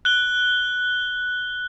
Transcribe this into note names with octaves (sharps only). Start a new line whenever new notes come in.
F#6 G7